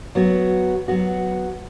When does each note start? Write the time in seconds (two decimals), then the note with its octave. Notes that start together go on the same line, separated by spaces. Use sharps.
0.15 F#3 B3 F#4
0.88 F#3 B3 F#4